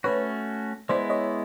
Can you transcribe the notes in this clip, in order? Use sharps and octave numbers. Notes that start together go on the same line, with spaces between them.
A3 C#4 F#4 B4 C#5
G#3 B3 E4 C5 D5
C#5 D#5